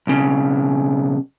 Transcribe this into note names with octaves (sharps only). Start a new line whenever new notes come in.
B1 C#3